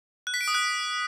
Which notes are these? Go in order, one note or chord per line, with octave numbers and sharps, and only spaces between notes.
F#6
B6
D7
D#6
F#6